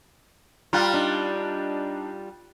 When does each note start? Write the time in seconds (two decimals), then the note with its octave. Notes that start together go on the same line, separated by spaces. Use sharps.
0.73 G3 F4 A#5 F#6 A6
0.94 D4 D#4